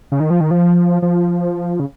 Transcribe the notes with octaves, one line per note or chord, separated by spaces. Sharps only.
C#3
D#3
F3
D#3
F3
F3
C#3